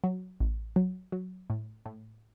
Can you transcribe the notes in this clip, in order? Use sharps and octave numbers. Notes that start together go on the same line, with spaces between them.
F#3
A1
F#3
F#3
A2
A2